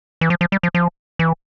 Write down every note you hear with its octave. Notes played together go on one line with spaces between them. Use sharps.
E3
F3
F3
G3
F3
F3
E3